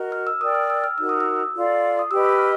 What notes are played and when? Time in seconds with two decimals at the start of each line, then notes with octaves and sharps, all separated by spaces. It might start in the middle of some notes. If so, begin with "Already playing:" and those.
Already playing: F#4 A#4 D#5
0.12 F6
0.27 E6
0.40 A#4 D5 G5 D#6
0.55 F6
0.70 E6
0.84 F6
0.98 D#4 F#4 A#4 E6
1.09 D#6
1.21 E6
1.55 F4 A4 D5
1.99 D#6
2.11 G4 B4 D#5 E6
2.25 E6
2.38 F6